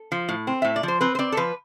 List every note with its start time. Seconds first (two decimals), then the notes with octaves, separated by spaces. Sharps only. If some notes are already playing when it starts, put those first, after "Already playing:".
Already playing: A4
0.12 F3
0.29 A2
0.47 C4
0.62 A2 E5
0.76 D5
0.83 F3 C5
1.01 C4 B4
1.15 C5
1.19 C4 D5
1.32 A4
1.37 F3 B4